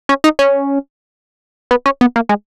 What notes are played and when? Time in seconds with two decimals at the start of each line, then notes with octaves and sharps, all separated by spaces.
0.09 C#4
0.24 D#4
0.39 C#4
1.71 B3
1.86 C#4
2.01 B3
2.16 A#3
2.29 G#3